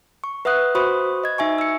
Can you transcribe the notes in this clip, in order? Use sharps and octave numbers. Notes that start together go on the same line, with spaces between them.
C#6
B4 E5 F#5 D#6 F#6
F#4 C5 B5 C#6 D#6
D#5 G#6
D#4 E5 G#5 C#6
E6 C#7